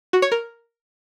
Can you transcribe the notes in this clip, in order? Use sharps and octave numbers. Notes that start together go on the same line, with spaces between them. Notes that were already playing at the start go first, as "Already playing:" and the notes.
F#4
C#5
A#4